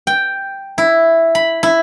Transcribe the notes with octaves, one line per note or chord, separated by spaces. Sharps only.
G5
E4
B5
E4